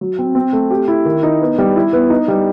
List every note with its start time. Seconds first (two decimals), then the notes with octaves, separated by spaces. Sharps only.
0.01 F#3
0.19 C4
0.35 C4
0.53 A3
0.70 G4
0.88 E4
1.05 D#3
1.23 D#4
1.41 B3
1.58 G3
1.76 E4
1.93 B3
2.10 D#4
2.28 G3